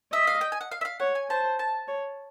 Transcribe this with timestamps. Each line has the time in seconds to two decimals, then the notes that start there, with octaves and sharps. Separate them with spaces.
0.12 D#5 E5
0.27 F5
0.41 G5
0.52 G#5
0.61 F#5
0.71 F5
0.81 E5
0.85 F5
1.00 C#5 F#5
1.15 G#5
1.30 C5 A5
1.59 A5
1.88 C#5